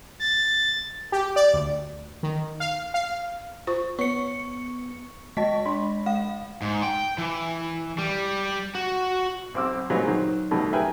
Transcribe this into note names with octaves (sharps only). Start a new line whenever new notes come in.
A6
G4
D5
D2
D#3
F5
F5
F4 C5 C#6
B3 C#5 C#6 C#7
G#3 D#5 A5 B6
D4 B5
G#3 F5
G#2
G5
E3
G3
F#4
B1 C4 D6 E6
A#2 F#3 G#3 B3 C4 D#4
D#3 F#3 C5
B2 D#3 F#3 G3 A3
A#4 B4 E5 G5 G#5 A#5